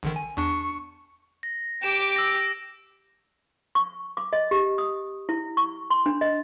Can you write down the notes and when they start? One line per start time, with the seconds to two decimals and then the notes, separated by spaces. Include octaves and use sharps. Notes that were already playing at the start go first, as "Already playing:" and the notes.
0.03 A#1 D3 D#3
0.16 G#5
0.37 E2 D4 C#6
1.43 A#6
1.83 G4 D6 E7
2.16 E6 A#6
3.75 C#6
4.17 D6
4.33 D#5
4.51 G4
4.78 D#6
5.29 E4
5.57 C#6
5.90 C6
6.06 D4
6.21 D#5